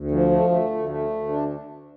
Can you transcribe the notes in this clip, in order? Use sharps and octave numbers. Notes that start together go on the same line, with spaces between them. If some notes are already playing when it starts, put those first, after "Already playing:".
Already playing: D2
F3
A3
A3
D2
A3
D2
D4